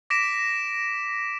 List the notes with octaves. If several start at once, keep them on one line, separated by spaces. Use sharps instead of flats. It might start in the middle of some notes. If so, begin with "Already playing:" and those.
D6 A#6 B6 D7 E7